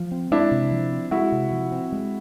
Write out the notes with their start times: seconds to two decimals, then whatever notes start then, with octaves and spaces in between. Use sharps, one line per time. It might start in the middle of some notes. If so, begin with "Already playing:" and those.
Already playing: F3
0.11 C4
0.31 G#3 D4 E4
0.51 C3
0.72 F3
0.92 C4
1.11 G#3 E4 F#4
1.32 C3
1.52 F3
1.72 C4
1.92 G#3